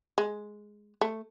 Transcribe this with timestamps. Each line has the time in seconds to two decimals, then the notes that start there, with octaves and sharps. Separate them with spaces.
0.18 G#3
1.01 A3